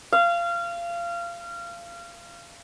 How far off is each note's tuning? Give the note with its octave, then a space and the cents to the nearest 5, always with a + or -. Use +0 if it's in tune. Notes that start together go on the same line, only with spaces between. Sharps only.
F5 -25